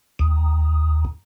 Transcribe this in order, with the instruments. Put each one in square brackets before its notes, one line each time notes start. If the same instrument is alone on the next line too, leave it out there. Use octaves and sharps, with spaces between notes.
[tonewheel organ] D#2